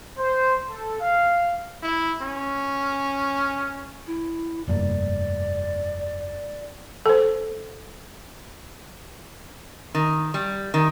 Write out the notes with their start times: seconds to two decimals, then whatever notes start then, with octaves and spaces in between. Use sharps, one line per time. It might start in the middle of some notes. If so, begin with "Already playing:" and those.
0.18 C5
0.70 A4
1.01 F5
1.82 E4
2.22 C#4
4.07 E4
4.68 F1 G2 A#3 D5
7.06 A4 C5
9.95 D#3
10.34 G3
10.74 D#3